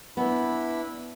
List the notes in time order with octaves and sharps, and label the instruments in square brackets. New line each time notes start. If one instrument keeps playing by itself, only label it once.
[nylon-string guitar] B3 [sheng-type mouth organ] D4 E4 B5